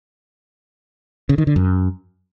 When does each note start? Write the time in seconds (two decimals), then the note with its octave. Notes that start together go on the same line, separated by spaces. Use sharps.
1.29 C#3
1.38 D#3
1.47 D3
1.56 F#2